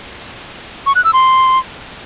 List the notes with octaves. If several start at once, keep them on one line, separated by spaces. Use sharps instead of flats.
C#6
F#6
E6
C6